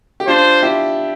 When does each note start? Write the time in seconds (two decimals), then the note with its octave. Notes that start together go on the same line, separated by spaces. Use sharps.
0.20 G4
0.27 D4 F4 C5
0.63 E4 G4